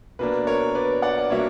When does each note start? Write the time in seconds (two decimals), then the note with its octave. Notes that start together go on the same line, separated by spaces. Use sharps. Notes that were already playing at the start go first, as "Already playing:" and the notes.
0.19 B2 A#3 D4 B4
0.47 A#4 C#5
0.75 B4 D5
1.02 D5 F#5
1.19 D5
1.30 B2 F#3 A#3 D4 C#5 E5